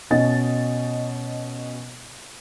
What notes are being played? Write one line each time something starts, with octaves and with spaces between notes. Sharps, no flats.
B2 C#4 D#5 A6